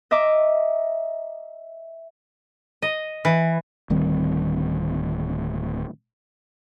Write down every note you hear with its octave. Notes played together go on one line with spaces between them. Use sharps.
D#5 E5 A#5 D6
D#5
E3
D1 D#3 G3 C4